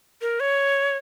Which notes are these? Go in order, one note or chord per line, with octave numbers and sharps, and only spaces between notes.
A#4
C#5